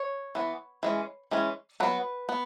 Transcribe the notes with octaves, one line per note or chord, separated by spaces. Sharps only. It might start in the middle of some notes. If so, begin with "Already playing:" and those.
Already playing: C#5
E3 B3
E3 G#3 C#4
E3 G#3 C#4
F#3 B3 B4
B3